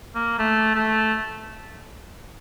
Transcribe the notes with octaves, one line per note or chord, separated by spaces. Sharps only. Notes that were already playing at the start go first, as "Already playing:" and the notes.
A#3
A3
A3